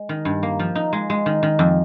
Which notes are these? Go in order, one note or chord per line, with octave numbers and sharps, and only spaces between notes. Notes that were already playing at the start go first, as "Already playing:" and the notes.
Already playing: G#3
D#3
G2
A#3
F3
D#4
G#3
G#3
D#3
D#3
F2